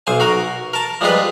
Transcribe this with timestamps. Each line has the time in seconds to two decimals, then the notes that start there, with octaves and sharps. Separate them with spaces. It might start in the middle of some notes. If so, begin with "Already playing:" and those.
0.07 B1 C5 G#5
0.20 F#4 A#4
0.73 A#4 A5
1.01 F3 G3 G#3 F4 B4